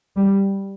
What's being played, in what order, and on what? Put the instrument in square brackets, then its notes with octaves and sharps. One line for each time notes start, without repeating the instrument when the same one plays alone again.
[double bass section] G3